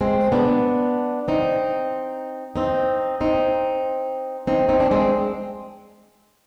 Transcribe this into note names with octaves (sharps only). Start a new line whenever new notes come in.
G#3 C4
B3 D4
C4 D#4
C4 D#4
C4 D#4
C4 D#4
C4 D#4
D4
G#3 C4